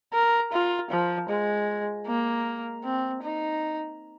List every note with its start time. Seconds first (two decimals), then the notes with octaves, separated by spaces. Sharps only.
0.13 A#4
0.52 F4
0.91 F3
1.29 G#3
2.07 A#3
2.84 C4
3.23 D#4